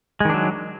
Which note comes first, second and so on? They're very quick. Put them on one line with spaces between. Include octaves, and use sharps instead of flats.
G#3 D#3 D4 F#3